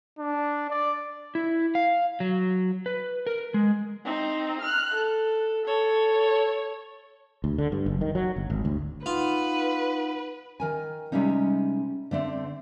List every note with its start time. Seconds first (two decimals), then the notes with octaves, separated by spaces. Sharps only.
0.19 D4
0.70 D5
1.35 E4
1.75 F5
2.20 F#3
2.86 B4
3.27 A#4
3.54 G#3
4.05 C4 D#4
4.61 F6 F#6
4.94 A4
5.65 A4 C#5
7.44 D2
7.58 D3
7.72 G2
7.86 F#1
8.01 D#3
8.15 F#3
8.36 G1
8.50 G#1
8.65 D2
9.06 D#4 F4 B4 F#5
10.60 D#3 A#4 G#5
11.12 C3 G3 G#3 C#4 D#4
12.11 D3 A3 C4 D4